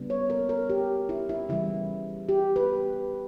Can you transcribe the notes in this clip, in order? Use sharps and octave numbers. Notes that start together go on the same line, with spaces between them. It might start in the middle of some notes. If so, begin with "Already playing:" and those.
Already playing: C#3 G3 B3 D4
C#5
A#4
A#4
G4
E4
E4
C#3 E3 G3 E4
G4
B4